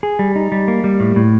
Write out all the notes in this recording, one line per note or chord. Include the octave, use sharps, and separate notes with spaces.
G#4
G3
D#4
G3
A#3
G3
A2
A2